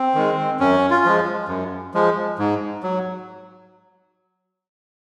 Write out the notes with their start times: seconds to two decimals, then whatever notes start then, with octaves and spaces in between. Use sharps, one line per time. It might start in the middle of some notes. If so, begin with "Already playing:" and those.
Already playing: C4
0.15 D#3 G#3
0.60 F#2 C#4
0.90 F4
1.05 F3 G#3
1.49 F#2
1.94 F3 G#3
2.39 G#2
2.83 F#3